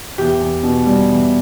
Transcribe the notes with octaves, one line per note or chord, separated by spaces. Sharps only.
E2 G4
E2
B2
G3
E2